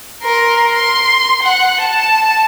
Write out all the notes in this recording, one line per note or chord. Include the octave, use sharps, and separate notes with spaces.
A#4 C6
C6
F#5
A5